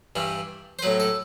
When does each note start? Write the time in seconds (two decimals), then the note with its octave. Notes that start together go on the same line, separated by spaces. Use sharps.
0.16 G2 E3 G3
0.79 C5
0.82 A2 F#3 B4
1.00 A4